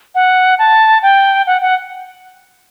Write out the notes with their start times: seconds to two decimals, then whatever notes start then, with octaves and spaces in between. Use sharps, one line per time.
0.15 F#5
0.58 A5
1.03 G5
1.47 F#5
1.62 F#5